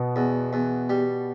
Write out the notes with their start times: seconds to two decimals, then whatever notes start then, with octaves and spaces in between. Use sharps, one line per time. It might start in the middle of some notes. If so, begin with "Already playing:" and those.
Already playing: B2 B3
0.16 E2
0.53 E2
0.89 G3